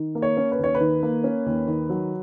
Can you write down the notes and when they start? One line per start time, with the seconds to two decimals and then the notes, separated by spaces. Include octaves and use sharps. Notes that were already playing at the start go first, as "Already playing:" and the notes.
Already playing: D#3
0.15 A#3
0.22 C#5
0.37 C#4
0.52 B4
0.59 D#2 C#5
0.75 B4
0.80 D#3
1.03 A#3
1.24 C#4
1.46 D#2
1.68 D#3
1.90 F#3